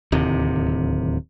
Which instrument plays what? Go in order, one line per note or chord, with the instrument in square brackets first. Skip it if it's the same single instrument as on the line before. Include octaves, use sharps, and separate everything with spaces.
[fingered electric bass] D1 D#2 C3